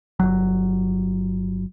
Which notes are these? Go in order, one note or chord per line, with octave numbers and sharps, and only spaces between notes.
G1 C#2 F#3